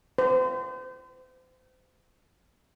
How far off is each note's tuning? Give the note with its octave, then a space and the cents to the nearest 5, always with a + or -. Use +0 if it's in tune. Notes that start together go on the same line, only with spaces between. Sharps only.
C5 -35